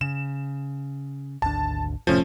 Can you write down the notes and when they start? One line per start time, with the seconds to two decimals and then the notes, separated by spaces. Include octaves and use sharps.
0.01 C#3 E7
1.42 G#1 D2 D4 A5
2.07 F1 A2 C3 F3 A3 C#4